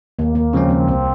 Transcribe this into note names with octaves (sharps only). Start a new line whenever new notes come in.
D#2 A#3
A#3
C#3 F3 G#3 C4 C#4
C4
C2 C4